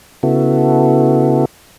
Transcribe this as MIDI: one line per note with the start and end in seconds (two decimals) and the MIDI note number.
0.23 1.45 49
0.23 1.45 59
0.23 1.45 64
0.23 1.45 66
0.23 1.45 69